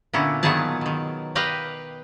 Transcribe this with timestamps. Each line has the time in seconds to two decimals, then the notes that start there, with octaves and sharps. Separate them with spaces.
0.13 A#2 D3 B3 C#4 E4
0.43 A#2 D#3 F#3 B3 G#4 A5
0.81 B2 D#3
1.35 G4 B4 D#5 F5 G5